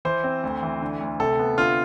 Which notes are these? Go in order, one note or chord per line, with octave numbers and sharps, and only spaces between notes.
E3 C5
C4
D2
E3
D3
D2
C3 A4
B3
D3 F4